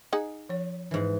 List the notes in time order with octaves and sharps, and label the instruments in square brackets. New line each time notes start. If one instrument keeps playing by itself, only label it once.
[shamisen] D#4 G#4 F#5
[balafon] F3 C#5
[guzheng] G#2 E3